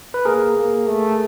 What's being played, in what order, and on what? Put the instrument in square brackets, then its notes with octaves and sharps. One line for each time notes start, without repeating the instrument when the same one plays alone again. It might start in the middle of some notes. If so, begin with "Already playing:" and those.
[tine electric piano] B4
[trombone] A#3 [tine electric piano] G#4 A#4
[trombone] A#3
A3